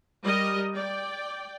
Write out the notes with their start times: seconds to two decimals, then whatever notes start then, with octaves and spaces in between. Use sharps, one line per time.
0.21 G3 A#4 D#5
0.75 D5 G5